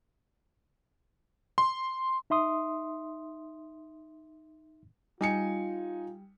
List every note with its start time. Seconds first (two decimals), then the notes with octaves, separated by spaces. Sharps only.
1.58 C6
2.30 D#4 E5 C6 D#6
5.21 G3 D#4 F4 G#5 C#7